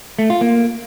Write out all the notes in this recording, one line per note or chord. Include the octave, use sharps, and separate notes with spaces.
A3
F4
A#3